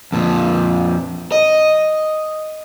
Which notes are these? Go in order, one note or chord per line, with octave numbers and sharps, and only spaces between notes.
F2 A#2
D#5